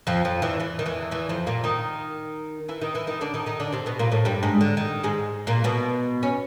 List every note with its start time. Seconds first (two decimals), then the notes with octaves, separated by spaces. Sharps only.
0.07 F2 F3
0.25 F2 F3
0.42 E2 E3
0.60 E2 E3
0.79 D#3
0.86 E2 E3
1.11 E2 E3
1.29 F2 F3
1.47 A#2 A#3
1.64 D#3 D#4
2.69 E3 E4
2.81 D#3 D#4
2.94 E3 E4
3.07 D#3 D#4
3.21 D3 D4
3.34 D#3 D#4
3.46 D#3 D#4
3.60 D3 D4
3.72 C3 C4
3.86 B2 B3
3.99 A#2 A#3
4.12 A2 A3
4.25 G2 G3
4.43 G#2 G#3
4.61 D3
4.77 D#3
5.04 G#2 G#3
5.47 A#2 A#3
5.64 B2 B3
6.23 C#4